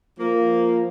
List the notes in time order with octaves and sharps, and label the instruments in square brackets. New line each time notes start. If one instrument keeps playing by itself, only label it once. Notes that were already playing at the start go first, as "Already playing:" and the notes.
[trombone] F3 [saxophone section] A#3